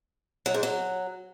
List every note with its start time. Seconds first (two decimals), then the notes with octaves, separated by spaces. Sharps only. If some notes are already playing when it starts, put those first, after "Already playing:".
0.46 F#3
0.54 G#2
0.63 F#3